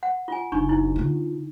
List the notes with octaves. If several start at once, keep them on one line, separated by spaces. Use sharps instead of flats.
F#5
F4 G#5
F#1 D4 D#4 C#6
D#4 E4
D3 F4